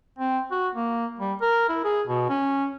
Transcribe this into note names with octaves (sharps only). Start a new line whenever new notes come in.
C4
F#4
A#3
G3
A#4
E4
G#4
B2
C#4